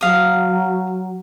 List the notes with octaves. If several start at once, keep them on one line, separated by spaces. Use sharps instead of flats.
F#3 F5 D#6